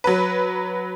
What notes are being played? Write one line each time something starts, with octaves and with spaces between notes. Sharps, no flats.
F#3 B4